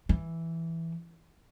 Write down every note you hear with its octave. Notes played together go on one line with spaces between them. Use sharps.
E3